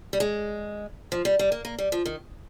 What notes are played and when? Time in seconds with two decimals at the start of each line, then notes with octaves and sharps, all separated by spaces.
0.13 G3
0.20 G#3
1.12 F3
1.25 G3
1.39 G3
1.52 A#3
1.65 A#3
1.78 G3
1.92 F3
2.05 D#3